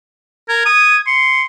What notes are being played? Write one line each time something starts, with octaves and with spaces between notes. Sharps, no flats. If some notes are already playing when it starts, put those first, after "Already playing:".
A#4 G#6
D#6
C6 C#7